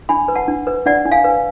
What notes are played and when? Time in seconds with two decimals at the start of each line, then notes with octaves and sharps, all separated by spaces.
0.09 D4 G#5 B5
0.28 B4
0.35 F#5 A5
0.48 D4
0.67 B4
0.86 D4 D5 F#5
1.05 D4
1.11 F5 G#5
1.24 B4